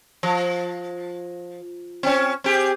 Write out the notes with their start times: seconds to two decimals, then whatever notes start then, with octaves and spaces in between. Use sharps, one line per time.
0.23 F3
2.03 C4 C#4
2.44 C4 G4 G#4